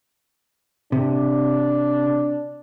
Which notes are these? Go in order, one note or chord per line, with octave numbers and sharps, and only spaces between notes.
C3 D4